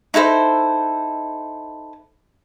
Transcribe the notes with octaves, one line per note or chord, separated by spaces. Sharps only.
D#4 E4 A4 C5